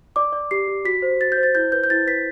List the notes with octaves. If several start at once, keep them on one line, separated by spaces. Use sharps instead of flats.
D5 D6
D5
G4 C7
G4
F#4 B6
C5
F#4 A6
G6
C5
A6
E4 G6
B4 G6
G6
E4 A6
B4 B6